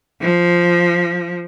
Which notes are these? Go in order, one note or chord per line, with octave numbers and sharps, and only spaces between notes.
F3